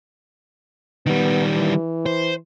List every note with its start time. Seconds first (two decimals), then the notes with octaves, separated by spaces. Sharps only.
1.06 D#3 G3 B3
1.54 E3
2.06 C5